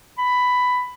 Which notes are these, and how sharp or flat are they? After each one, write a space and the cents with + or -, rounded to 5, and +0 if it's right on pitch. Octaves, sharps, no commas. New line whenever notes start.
B5 +10